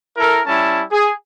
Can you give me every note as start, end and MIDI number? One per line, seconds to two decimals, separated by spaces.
0.17 0.41 64
0.17 0.41 69
0.17 0.41 70
0.46 0.82 55
0.46 0.82 61
0.46 0.82 64
0.46 0.82 81
0.91 1.11 68